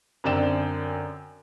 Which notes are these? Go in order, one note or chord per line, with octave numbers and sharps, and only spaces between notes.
F#2 D3 C4 D5 G5 E7